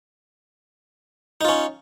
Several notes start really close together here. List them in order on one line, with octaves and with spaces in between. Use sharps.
D#4 F4 C#4